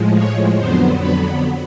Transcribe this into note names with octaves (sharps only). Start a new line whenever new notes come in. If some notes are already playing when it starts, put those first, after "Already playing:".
Already playing: A2 F3 G#3
C#5
F2 D3 F#3 B3 C5
B4